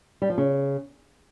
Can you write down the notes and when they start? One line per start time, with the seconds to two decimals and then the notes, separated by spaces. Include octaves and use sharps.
0.22 G3
0.30 F3
0.38 C#3